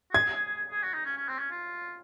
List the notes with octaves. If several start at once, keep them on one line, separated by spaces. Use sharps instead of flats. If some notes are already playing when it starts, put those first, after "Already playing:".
F#4
G#4 G#6
G#4
F#4
D#4
C#4
C#4
C4
C#4
F4